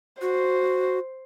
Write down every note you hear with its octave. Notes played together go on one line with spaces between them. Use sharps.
F#4 C5